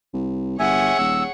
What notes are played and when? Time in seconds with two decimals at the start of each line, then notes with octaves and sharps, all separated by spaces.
0.13 C2
0.59 G1 G#4 C#5 E5 F#5 G#5
0.99 D#1 E6